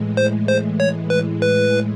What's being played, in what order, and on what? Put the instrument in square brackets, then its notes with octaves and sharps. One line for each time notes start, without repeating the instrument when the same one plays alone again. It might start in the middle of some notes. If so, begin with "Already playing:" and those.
Already playing: [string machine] A2 E3 G#3
[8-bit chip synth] C5
C5
C#5
B4
B4